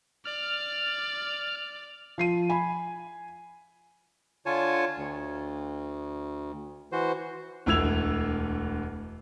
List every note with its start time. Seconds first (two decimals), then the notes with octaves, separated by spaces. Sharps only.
0.25 D5 F6
2.18 F3 C7 D#7
2.50 G#5 B5
4.46 D3 F4 C#5 G#5 A5
4.97 D2
6.92 E3 F#4 C5
7.66 E1 D2 E4 E6 G#6 F7